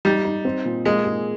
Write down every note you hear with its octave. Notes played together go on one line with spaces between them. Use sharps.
G3 D#4
D#4
C4
A#2
G#3 A#3
G#4